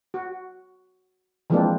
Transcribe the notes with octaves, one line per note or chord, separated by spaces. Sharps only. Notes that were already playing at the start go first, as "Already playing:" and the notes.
F#4
E3 F3 G#3 A#3 C4 D4